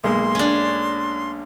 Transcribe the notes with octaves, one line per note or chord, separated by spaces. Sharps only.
B1 G#3 A#3 C6
C#4 D4